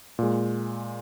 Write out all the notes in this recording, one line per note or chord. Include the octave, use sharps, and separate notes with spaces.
A#2 G#3